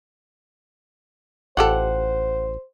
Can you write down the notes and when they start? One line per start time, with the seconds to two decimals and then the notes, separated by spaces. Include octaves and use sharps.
1.57 A1 F4 G4 A4 C5 F#5